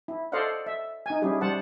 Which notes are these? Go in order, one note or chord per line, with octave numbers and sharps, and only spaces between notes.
E4
A4 C5 D5 D#5 F5 F#5
E5
D#4 G#5
G3 C#4 E4 G4 G#4
G3 C5 F#5 A5